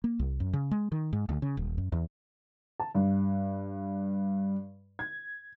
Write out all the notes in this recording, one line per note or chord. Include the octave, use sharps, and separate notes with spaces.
A#3
C2
F#2
C#3
G#3
D#3
G#2
D2
C#3
D#1
F#2
E2
A5
G2
G#6